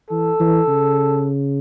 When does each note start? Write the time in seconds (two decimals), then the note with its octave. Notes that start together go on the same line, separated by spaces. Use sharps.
0.10 E3 A4
0.40 E3
0.68 C#3